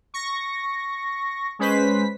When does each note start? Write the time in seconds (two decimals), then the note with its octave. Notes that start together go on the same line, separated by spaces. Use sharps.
0.14 C#6 A#6
1.59 G#3 C#4 B4 C5 B6